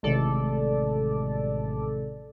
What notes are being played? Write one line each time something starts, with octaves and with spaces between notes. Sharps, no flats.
A1 C3 D#3 G#3 A4 D5